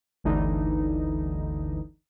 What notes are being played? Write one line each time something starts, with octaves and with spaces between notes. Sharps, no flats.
G1 D2 D3 E3 D#4